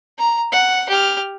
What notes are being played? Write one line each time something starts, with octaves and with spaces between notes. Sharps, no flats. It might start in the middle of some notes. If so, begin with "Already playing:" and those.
A#5
F#5
G4 F6